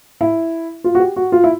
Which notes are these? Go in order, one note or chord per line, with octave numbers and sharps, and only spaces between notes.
E4
F4
F#4
G4
F#4
F4
E4